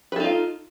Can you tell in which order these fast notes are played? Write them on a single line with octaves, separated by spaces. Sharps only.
B4 A4 D#4 F4